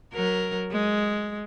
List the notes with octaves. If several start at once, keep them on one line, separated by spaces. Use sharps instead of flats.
F#3 A#4
G#3